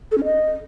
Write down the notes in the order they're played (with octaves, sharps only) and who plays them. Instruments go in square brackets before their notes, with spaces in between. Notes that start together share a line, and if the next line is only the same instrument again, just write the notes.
[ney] A4
C#4
D#5